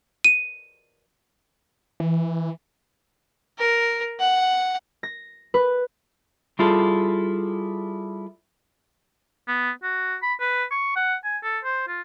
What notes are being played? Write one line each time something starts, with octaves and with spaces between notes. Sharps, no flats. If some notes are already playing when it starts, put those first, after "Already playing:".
D#7
E3
A#4
F#5
A#6
B4
G3 E4 F4 G#4 A4
B3
F#4
B5
B4
C#6
F#5
G#5
A4
C5
F4